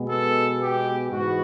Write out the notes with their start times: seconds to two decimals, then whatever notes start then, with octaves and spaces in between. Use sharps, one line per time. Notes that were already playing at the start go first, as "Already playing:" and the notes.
Already playing: B2 G#3 B3
0.09 A4
0.61 G4
1.13 G#2 E3 G#3 B3 F#4